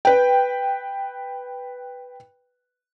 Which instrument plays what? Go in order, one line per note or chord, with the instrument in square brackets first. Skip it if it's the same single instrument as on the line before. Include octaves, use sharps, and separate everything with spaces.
[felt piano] B4 G5